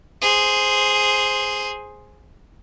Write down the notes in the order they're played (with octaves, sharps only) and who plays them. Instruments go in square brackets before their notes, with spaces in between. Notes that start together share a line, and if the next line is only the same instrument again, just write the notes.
[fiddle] G#4 C5